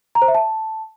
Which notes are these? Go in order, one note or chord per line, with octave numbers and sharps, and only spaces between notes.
A#5
C5
E5
A5